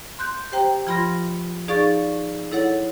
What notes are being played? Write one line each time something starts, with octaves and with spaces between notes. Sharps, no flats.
C6 F#6 G6
G4 C5 G5 A#5
F3 F4 B5 C6 A#6
D#4 G#4 D5 F5 C#6 A6
E4 A4 C#5 F#5